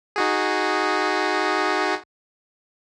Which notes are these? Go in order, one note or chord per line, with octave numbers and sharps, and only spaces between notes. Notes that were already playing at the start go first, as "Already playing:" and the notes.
D#4 F#4 G#4